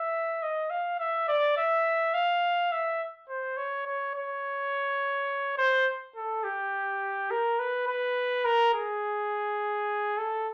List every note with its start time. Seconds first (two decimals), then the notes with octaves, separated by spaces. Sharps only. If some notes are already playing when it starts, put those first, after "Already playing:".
Already playing: E5
0.42 D#5
0.70 F5
0.99 E5
1.28 D5
1.57 E5
2.14 F5
2.72 E5
3.29 C5
3.57 C#5
3.86 C#5
4.15 C#5
5.58 C5
6.16 A4
6.44 G4
7.31 A#4
7.59 B4
7.88 B4
8.45 A#4
8.74 G#4
10.18 A4